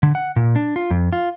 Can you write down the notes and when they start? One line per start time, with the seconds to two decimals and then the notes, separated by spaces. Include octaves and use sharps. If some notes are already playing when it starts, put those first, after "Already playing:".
0.03 D3
0.15 F#5
0.36 A#2
0.56 D4
0.76 F4
0.91 F2
1.13 F4